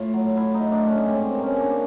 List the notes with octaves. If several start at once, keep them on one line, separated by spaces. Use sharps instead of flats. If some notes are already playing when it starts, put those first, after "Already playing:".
Already playing: A2 F4
F#3
A3 E4
D#4
A2
D4
A3
C#4
G#2 C4
C4
A#3
C#4
G#2
D4